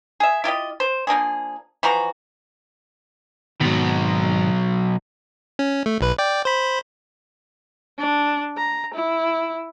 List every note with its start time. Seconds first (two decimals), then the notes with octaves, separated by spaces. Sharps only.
0.20 G#4 E5
0.44 E4 F4 G4 D#5
0.80 C5
1.07 F3 A#3 D4 G#4
1.83 E3 F3 F#4 A#5
3.61 G#2 B2 D#3 F#3
5.59 C#4
5.86 A3
6.01 B1 B4
6.18 D5 G5
6.45 C5 B5
7.98 D4
8.57 A#5
8.94 E4